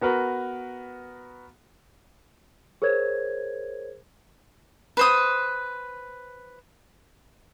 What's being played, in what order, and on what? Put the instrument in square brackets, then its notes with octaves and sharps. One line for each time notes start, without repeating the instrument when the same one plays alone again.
[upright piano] B3 F#4 A#4 B4
[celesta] G#4 A#4 C5 C#5 G#6
[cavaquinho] B4 C5 D#6